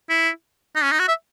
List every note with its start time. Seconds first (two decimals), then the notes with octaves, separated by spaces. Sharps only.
0.09 E4
0.75 D#4
0.83 C#4
0.92 D#4
0.99 F#4
1.08 E5